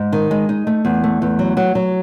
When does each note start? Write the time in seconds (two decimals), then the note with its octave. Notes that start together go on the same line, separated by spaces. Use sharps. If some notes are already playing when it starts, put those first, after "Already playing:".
Already playing: G#2
0.13 D#3
0.31 G#3
0.49 D#4
0.67 A3
0.85 E2
1.04 A3
1.22 E2
1.39 F#3
1.57 F#3
1.75 F#3